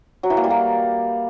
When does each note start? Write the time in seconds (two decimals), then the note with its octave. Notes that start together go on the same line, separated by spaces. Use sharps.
0.23 F#3
0.30 E3
0.37 A#3
0.44 G3
0.50 A#3